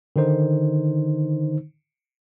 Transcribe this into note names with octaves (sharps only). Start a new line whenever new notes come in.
D3 D#3 D#4 C5